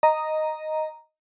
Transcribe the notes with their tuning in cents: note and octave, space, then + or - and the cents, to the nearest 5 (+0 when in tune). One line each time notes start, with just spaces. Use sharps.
D#5 +0 A#5 +0